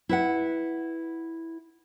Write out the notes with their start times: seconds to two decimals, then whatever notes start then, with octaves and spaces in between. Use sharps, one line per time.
0.09 E4 B4 F#5